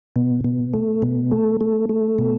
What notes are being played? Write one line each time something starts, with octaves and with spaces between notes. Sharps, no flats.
B2
B2
A3
B2
A3
A3
A3
B2